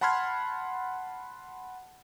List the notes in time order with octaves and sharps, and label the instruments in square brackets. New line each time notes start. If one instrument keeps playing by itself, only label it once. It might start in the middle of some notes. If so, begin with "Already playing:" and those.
[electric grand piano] F#5 A5 B5 C6 F6 G#6